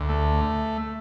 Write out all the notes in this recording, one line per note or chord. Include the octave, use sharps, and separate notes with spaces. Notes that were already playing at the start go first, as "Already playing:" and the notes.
Already playing: D2
A3